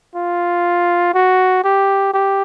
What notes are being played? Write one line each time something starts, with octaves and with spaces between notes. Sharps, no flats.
F4
F#4
G4
G4